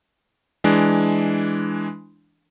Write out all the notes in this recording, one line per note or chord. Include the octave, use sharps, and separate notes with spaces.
E3 G#3 D4